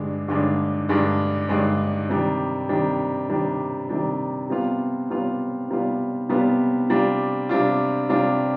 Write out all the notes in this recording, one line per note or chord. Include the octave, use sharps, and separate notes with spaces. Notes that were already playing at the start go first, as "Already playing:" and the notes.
Already playing: G2 D3 G#3 D4
G2 D3 G#3 D4
G2 D3 G#3 D4
G2 D3 G#3 D4
C3 D#3 G3 D4
C3 D#3 G3 D4
C3 D#3 G3 D4
C3 D#3 G3 D4
C3 G3 B3 F4
C3 G3 B3 F4
C3 G3 B3 F4
C3 G3 B3 F4
C3 G3 D4 F4
C3 G3 D4 F4
C3 G3 D4 F4